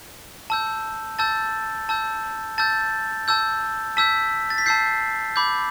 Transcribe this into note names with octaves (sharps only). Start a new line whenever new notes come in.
A5 E6 G6
A5 E6 G6 A6
A5 E6 G6
A5 E6 G6 A6
A5 E6 G6
A5 E6 G6 B6
A6
B6
A5 E6 G6 C7
B5 D6 G6